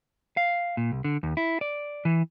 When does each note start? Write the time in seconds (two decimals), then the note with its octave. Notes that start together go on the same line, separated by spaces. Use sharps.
0.37 F5
0.77 A#2
0.92 C2
1.04 D3
1.23 D#2
1.37 E4
1.61 D5
2.05 E3